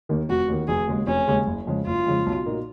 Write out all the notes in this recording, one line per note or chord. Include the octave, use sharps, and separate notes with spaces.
D#2 D#3
F1 F#4
D#2 D#3
F1 G#4
D#2 C#3 G#3
F1 C#4
D#2 C#3 G#3
F#1
F2 C#3 G#3
F#1 F4
F2 C#3 G#3
B1
A#2 F#3 A#3 D#4